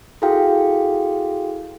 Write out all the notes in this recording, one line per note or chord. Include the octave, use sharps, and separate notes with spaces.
E4 F#4 G#4 A4 F5 G5